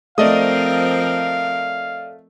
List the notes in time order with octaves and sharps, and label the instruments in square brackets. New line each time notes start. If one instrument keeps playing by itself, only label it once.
[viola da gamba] F3 C4 A#4 [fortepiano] A3 [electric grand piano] D5 D#5 D#6 [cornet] F5